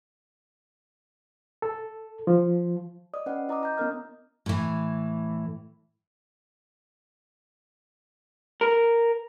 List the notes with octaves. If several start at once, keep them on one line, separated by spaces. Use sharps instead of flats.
A4
F3
D5 D#5 D#6
C#4 B4 D5 F#5
E4 D#5 A#5 D6 D#6
A#5 G6
B3 C#4 D4 A#4 D#5 F6
A2 E3
A#4